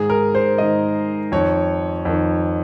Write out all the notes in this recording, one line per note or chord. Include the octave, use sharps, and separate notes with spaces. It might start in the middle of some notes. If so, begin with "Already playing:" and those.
Already playing: G#2 D#3 G#4
A#4
C5
G#2 D#3 D#5
F2 D#3 C#5
F2 D#3